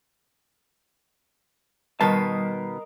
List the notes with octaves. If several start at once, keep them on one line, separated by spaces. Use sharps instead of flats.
B2 D#3 G3 A#4 B4 D#5 A5 C7